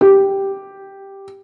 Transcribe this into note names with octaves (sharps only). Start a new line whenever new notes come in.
G4